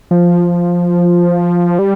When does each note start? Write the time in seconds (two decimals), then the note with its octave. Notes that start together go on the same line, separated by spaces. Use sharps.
0.11 F3
1.79 G3